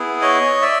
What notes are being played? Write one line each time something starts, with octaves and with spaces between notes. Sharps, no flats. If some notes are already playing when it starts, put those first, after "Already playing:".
Already playing: B3 E4 G#4
C#5 D#5
D5 E5